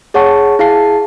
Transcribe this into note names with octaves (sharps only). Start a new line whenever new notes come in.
G#4 C#5 F#5 A5 C#6
E4 G#4 F5 A5 C7